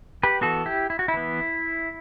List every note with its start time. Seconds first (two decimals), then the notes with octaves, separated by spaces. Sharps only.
0.23 G4 B4
0.41 E3 B3 F#4 A4
0.66 E4 G4
0.90 E4
0.99 F#4
1.08 E4
1.14 E3 B3